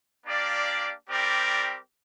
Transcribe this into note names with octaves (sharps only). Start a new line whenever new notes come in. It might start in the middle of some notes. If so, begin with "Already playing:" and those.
A#3 D4 G4 D5 F5
G3 C4 G4 A#4 D5